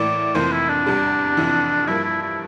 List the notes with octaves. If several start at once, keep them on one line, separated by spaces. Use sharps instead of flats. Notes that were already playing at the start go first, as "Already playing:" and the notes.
Already playing: A2 E3 A#3 E4 D5
F1 F2 E3 A#3 C5
E4
D4
E2 C3 G3
F1 F2 E3
G2 F3 A#3 E4
E4
E4